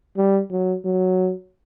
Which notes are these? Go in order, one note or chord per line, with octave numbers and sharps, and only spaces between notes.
G3
F#3
F#3